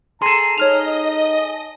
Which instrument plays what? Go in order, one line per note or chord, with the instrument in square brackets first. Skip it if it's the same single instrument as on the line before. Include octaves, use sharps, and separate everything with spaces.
[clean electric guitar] G#4 A4 [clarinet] A#5 [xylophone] C6
[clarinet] D#4 [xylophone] C#5 F6 F7 [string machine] D#5